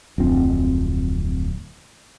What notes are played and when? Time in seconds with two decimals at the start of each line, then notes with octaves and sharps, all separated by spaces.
0.18 D1 F2 C4